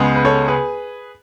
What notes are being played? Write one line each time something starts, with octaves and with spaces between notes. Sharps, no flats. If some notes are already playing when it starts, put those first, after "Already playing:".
Already playing: C#2 C#3 G#3 B3
B4
A4 C#5
G#4 B4